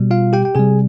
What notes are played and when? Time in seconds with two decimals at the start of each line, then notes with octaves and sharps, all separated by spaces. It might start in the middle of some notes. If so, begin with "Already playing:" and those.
Already playing: B2 G3
0.11 F4 F5
0.33 G4 G5
0.45 G5
0.55 C3 G3 G#4 G#5